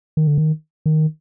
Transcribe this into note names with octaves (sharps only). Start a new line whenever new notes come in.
D#3
D3
D#3
D#3